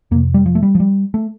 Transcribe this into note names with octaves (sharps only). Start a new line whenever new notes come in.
F2 C3 A#3
G3
F3
A3
G3
F3
G3
A3